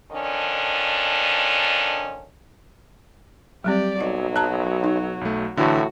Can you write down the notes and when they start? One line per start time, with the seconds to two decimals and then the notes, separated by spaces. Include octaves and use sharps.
0.11 F2 D#3 C#4 D4
3.64 F#3 G3 C4 G4 D5
4.00 B1 F#3 D#5
4.36 A5 A#5 F#6
4.84 D#4
5.21 B1 A3
5.57 A2 D3 E3 F#4